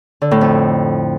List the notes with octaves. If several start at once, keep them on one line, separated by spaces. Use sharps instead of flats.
D3
A2
F2